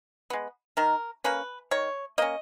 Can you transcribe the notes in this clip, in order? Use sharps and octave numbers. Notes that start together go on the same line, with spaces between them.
G#3 B3
D#3 A#4
A#3 C#4 B4
D#3 C#5
A#3 C#4 D#5